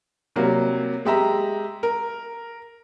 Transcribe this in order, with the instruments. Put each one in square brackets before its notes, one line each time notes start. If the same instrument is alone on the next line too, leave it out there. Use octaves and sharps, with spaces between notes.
[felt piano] C3 F#3 G3 A#3
G#3 G4 E5 A#5
A#4